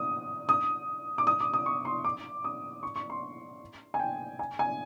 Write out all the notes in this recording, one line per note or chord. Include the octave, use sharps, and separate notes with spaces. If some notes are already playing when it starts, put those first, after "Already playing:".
Already playing: D#6
D#6
D6
D#6
D6
D#6
C#6
C6
D6
D#6
C#6
C#6
C6
G#5
G5
G#5
G#5